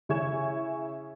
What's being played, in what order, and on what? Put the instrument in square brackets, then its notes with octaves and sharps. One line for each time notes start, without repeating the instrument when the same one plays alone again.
[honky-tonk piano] C#3 E4 G#5 C#6 G#6 E7